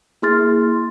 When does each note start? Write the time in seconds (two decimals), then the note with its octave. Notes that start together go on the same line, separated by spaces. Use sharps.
0.22 A#3 E4 G#4 C6 F6 A6